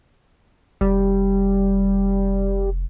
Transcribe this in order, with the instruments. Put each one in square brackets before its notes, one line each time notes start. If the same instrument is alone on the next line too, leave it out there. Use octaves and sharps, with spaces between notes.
[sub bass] F1 [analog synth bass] G3